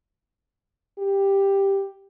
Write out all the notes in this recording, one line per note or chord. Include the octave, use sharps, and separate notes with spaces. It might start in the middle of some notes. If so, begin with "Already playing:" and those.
G4